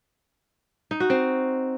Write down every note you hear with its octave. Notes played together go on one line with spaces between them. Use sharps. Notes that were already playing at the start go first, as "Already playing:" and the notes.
D#4
F#4
C4